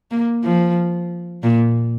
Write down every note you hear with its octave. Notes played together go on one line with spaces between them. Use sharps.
A#3
F3
A#2